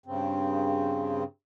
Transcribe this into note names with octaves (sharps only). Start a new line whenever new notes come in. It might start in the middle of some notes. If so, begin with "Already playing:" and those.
G2 C#3 C4